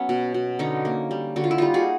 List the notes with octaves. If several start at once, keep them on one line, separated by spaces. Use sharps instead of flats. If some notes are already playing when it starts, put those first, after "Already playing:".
Already playing: F#3 B3 C#4
B2
B2
D3 C#4 D#4
A#3
G3
D3 F#4
F4
E4
G3 D#4 F4
F#4 G#4